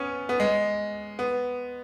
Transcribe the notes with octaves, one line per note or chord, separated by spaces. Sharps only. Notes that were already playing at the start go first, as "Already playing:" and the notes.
Already playing: B3 C#4
B3
G#3
B3